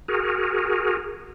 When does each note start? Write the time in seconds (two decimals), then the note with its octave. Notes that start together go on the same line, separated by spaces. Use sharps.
0.08 F#4 G#4 A#4